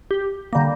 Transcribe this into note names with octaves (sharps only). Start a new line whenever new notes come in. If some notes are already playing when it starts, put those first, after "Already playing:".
G4
D3 G3 A#3